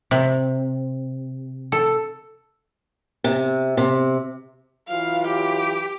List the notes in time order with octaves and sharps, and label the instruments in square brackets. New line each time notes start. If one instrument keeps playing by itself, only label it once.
[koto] C3
A4
[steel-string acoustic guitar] C3
C3
[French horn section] E3 F#3 F4 [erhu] F5
[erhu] G4